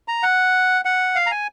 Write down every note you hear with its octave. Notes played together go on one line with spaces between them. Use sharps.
A#5
F#5
F#5
F5
A#5
G#5